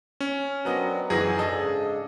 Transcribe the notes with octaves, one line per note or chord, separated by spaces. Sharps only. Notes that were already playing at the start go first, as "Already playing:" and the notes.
C#4
F#3 B3 C4 D4 A#4 D#5
F#2 E3 C#4 D#4 F#4 G#4 A#6
G#2 C#3 D4 A4 D#5